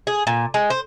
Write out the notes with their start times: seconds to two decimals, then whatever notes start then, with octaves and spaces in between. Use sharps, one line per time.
0.07 G#4
0.27 A#2
0.54 G#3
0.70 C5